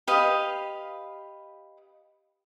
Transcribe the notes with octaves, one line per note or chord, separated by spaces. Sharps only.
G4 B4 D#5 F5